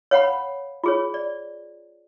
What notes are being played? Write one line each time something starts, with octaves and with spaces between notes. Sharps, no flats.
C#5 F5 F#5 B5
F4 G#4 C#5
D5